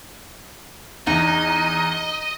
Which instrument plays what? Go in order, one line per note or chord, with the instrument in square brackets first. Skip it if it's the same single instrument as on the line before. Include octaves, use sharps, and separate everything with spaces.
[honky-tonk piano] E2 [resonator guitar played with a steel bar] D#4 [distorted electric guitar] D#5 [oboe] A#5